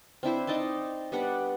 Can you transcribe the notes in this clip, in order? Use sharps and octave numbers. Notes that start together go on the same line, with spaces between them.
C4 D4 E4 C5
D#4 D5 A5 C6
G3 B3 D4 F#5